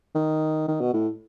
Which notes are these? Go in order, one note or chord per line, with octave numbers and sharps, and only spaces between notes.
D#3
D#3
B2
A2